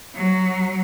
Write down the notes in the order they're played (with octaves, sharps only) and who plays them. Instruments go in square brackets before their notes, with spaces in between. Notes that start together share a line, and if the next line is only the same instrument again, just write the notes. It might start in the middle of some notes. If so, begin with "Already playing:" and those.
[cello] F#3